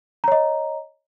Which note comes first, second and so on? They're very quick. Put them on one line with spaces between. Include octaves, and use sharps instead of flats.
A#5 C#5 D#5